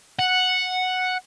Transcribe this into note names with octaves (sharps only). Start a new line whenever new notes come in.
F#5